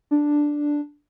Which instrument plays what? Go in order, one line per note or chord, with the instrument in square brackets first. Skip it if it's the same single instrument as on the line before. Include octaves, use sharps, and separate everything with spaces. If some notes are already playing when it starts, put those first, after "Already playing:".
[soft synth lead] D4